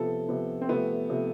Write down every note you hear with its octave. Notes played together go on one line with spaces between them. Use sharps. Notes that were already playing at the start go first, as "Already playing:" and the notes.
Already playing: C3 F3 B3 A4
C3 F3 B3
C4
C3 F3 A3 B3
C3 F3 A3